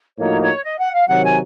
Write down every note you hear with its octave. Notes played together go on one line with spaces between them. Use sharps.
A2 F3 A#3 D#4 F#4 C#5
C#5
D#5
F#5
F5
C3 D#3 F#3 F#5
G#5